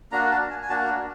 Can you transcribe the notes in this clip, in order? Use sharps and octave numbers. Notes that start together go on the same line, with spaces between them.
A#3 D4 F#4 A#5
A5
G#5
G#5
A#3 D4 F#4 A5